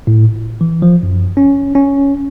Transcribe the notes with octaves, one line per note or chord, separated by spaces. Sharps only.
A2
G1
E3
F3
F#2
C#4
C#4